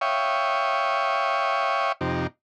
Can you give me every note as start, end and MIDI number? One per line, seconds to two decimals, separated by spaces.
0.01 1.92 73
0.01 1.92 76
0.01 1.92 77
0.01 1.92 79
0.01 1.92 85
0.01 1.92 87
2.01 2.27 41
2.01 2.27 48
2.01 2.27 63
2.01 2.27 67